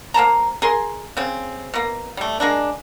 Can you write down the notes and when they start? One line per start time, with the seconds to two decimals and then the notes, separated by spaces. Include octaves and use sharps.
0.14 A#3 C5 A5 A#5
0.62 G#4 A#4 C6
1.17 C#3 C4
1.74 B2 A#3
2.17 G3 A3
2.40 G#3 A#3 D4